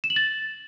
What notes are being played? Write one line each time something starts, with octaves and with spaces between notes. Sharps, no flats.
E7
F#7
A6